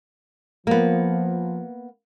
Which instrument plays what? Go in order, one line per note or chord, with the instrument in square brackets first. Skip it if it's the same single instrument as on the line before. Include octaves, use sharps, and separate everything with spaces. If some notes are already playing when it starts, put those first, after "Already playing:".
[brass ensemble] F3 [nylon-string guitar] A#3 B3